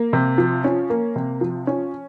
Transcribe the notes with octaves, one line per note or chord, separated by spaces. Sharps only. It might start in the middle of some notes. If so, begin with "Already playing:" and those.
Already playing: A#3
C3
F3
C#4
A#3
C3
F3
C#4